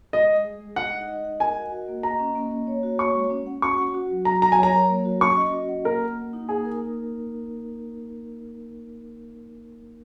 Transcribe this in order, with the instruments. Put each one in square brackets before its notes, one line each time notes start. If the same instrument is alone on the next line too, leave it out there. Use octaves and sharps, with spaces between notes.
[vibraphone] G#3 [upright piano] D#5
[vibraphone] G#3
G#4
G#3
[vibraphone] D#5 [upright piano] F#5
[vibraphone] D#4
D#5
F#5
[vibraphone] A#4 [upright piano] G#5
[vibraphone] F#4
F#4
A#3
[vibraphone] D#5 [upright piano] A#5
[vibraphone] C#4
A#3
A#3
C#5
F#4
[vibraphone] C#5 [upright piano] C#6
[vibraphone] G#3
C#4
F#5
[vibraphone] F#4 [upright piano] C#6
[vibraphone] F#5
F#4
F#3
[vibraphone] F#3 [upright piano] A#5
[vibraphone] F#3 [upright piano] A#5
[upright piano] G#5
[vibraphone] C#5
[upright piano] A#5
[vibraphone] A#4
A#3
F#4
[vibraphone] C#4 [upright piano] C#6
[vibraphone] D#5
F#4
F#5
[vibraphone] A#3 [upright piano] A#4
[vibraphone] F#5
A#3
D#4
[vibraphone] A#3 [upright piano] G#4
[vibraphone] A#4
A#3